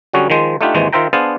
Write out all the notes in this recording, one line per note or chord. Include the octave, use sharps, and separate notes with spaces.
D3 F#3 G3 C#4 F#4 G#4
D#3 F3 G#3 C5
A3 D4 D#4 F4 G4 F#5
G#1 D#2 E3 G#3 C5
D#3 F4 C5 E5 G5 A#5
B3 D4 G#4 C5 F5 A5